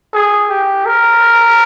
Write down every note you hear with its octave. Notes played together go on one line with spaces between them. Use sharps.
G#4
G4
A#4